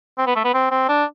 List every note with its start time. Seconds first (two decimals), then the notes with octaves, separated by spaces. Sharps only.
0.18 C4
0.26 B3
0.36 A3
0.44 B3
0.54 C4
0.71 C4
0.89 D4